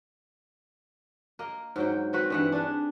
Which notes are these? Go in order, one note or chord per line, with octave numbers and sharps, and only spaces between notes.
A#3 D#5
G#2 F#3 G5
C4 F#4 B4
G2 E3 F#5
D4 G#4